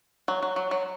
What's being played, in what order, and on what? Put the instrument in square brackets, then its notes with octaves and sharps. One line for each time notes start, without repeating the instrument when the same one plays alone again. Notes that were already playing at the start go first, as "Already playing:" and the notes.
[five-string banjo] F#3
F#3
F#3
F#3